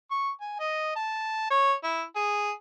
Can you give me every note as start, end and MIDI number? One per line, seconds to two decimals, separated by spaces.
0.11 0.30 85
0.41 0.58 80
0.59 0.92 75
0.96 1.48 81
1.50 1.74 73
1.83 2.03 64
2.16 2.51 68